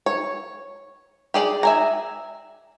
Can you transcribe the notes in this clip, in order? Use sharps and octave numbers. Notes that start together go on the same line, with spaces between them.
C#5
G4 G#4 D5
E5 G#5 A#5